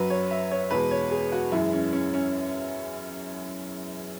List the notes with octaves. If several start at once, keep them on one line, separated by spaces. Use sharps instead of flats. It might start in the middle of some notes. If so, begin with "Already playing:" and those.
Already playing: F#2 F#3 B4
C#5
E5
C#5
E2 B2 G#3 B4
C#5
G#4
F#4
F#2 E3 G#3 E4
C#4
C#4
C#4